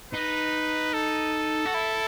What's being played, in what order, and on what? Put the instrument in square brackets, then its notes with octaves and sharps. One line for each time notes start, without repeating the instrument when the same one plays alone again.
[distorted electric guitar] D#4 [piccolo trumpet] B4
[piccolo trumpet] A4
[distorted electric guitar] F#4
E4